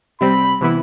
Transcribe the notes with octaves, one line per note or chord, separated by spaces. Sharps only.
C3 G3 C4 B5
C3 E3 B3 E4